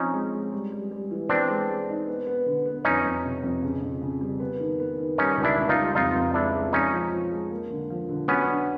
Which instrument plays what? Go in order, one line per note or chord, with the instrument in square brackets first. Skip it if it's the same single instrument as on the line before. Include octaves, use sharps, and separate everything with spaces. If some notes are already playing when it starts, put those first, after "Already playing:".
Already playing: [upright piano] F3 C4 [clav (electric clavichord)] C#4 D#4
[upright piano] G#3
G#3
G3
G3
G3
E3
[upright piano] B3 [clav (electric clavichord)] C4 D4
[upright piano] G#3
G#3
D#4
B3
B3
D3
B3
[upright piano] F2 [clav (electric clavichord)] C#4 D#4
[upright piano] F2
C3
F2
C#3
C#3
C#3
G3
B3
D#3
B3
D#3
[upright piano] G3 [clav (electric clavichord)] C#4 D#4
[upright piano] C#2
[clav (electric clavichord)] D4 E4
[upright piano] C#2
[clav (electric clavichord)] D#4 F4
[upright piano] G3
[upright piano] F2 [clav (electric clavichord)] D#4 F4
[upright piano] F2
[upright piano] G#3 [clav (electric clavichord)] D4 E4
[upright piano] G#3
[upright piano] F3 [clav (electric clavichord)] C#4 D#4
[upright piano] F3
F3
G#3
A#3
D3
F3
D3
[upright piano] F#3 [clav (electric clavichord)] B3 C#4
[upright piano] D4